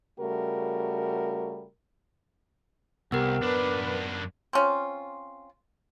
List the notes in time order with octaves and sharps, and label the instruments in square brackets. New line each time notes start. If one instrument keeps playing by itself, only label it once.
[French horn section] C#3 G3 A3 F#4 A#4
[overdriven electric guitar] C2 [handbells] B3 A#4 [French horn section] G4
[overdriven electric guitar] F#2 D4 [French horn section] B4
[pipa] C4 C#4 F4